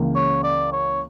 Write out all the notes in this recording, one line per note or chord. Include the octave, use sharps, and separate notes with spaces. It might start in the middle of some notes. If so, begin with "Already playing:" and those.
Already playing: C#2 C#3 E3 A#3
C#5
D5
C#5